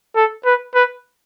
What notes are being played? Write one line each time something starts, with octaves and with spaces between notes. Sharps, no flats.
A4
B4
B4